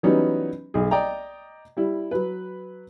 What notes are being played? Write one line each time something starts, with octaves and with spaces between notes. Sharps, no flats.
E3 F#3 G3 B3 C#4 D#4
B1 G#4
D5 D#5 G5 A#5
G3 E4
F#3 B4